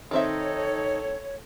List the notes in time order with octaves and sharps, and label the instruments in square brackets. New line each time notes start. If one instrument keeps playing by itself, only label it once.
[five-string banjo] D#3 C4 E5 [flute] D#4 [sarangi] A4 [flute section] C#5